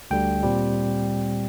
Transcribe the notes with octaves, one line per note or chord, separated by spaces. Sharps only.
D2 D3 G3 G5
A#2 G3 C4